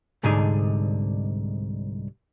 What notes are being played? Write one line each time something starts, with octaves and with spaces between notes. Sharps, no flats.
C2 G#2 D3 D4 D#4 G#4